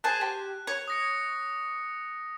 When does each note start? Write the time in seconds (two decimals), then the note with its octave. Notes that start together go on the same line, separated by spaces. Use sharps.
0.04 G#4 C5 A5 F#6
0.21 G4
0.67 C#5
0.88 D#6 A#6 C#7